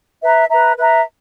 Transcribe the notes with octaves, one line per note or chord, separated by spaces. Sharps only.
B4 E5 A#5
B4 E5 A#5
B4 E5 A#5